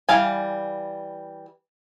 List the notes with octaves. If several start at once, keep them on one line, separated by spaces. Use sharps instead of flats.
E3 G3 F5 G#5